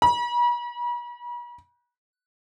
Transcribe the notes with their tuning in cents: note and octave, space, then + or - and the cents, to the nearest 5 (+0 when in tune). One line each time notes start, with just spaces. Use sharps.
B5 -45